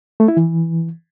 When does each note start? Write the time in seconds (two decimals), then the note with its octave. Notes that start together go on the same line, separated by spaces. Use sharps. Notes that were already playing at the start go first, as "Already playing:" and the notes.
0.20 A3
0.28 E4
0.37 E3